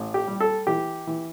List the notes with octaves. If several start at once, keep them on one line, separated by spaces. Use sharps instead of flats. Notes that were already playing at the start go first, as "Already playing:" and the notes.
Already playing: A1
G4
G3
A4
E3 G4
E3